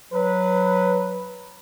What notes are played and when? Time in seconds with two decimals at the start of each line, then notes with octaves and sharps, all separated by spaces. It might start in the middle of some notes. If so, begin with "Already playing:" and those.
0.13 F#3 B4